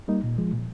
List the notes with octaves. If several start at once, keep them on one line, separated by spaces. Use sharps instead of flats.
G3 A#3 D#4
A#2
F3 G#3
A#2